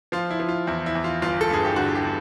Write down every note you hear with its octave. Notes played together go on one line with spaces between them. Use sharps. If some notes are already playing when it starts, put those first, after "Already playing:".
F3 F4
E4
F3
F4
E2 E4
E4
E2
F4
G1 F4
A4
G2 G#4
G4
D3 F#4
G4
D3